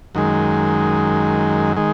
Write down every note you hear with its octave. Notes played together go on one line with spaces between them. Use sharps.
F#2 D#3 G#3
D#3 G#3